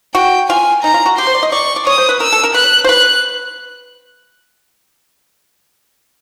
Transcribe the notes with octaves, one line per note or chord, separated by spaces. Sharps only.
F#4 G5
F4 G#5
D#4 A#5
F4
F#4
G4 C6
C5
D5
D#5
D5 C#6
D5
C#5 D#6
C5
B4
A#4 E6
A4
A#4
B4 F#6
C5
B4 F#6